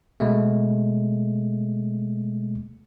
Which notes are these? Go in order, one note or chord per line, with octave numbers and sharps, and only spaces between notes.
B2 G#3 A3